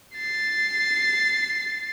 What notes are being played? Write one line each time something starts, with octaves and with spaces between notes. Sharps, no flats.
A6 C7